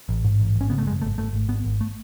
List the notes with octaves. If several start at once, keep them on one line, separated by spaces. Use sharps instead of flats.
A1
G#2
A1
G#1
C#4
C#3 B3
A3
F#2 G#3
G#1 A3
G#1 A3
G#1
G#1 B3
G#1
A3